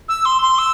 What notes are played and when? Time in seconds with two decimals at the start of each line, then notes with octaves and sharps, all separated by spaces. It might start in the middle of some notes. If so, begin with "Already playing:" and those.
0.09 E6
0.25 C6
0.42 C6
0.58 E6